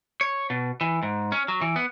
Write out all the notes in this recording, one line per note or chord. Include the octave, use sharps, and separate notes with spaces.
C#5
B2
E3
G#2
C#4
F#3
E3
B3